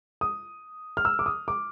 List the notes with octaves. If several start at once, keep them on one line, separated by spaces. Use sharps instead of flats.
D#6
F6
E6
D6
D#6
D6